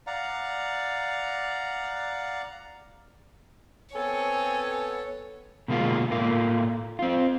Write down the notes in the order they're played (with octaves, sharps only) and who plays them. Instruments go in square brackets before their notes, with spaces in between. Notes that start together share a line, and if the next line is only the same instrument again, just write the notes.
[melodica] D5 F5 F#5 A#5
[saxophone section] B3 A4 [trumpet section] C4 G#5 [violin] C#5
[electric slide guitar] B2 D3 G#3 A#3 F4
A2 A3 A#3 F4
C4 F4